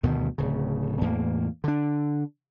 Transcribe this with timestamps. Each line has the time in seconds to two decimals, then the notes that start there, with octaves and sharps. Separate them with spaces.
0.03 D2 G2 B2 D#3
0.38 D1 C#3
1.01 E2 A2 A#3
1.64 D3 D4